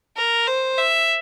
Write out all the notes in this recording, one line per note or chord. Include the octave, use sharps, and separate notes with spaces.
A#4
C5
E5